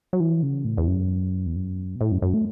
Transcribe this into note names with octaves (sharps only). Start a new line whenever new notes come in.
F#3
E3
C#3
A2
E2
F#2
E2
F#2
B2
A2
F#2
F#2
A3